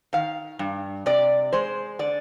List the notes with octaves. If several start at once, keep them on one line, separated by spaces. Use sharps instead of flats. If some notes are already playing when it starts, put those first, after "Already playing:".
D#3 F5
G2
C3 D5
G#3 C5
D3 D5